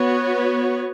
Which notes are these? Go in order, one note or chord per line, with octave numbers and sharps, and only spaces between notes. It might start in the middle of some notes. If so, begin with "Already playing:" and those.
Already playing: B3 F#4 C#5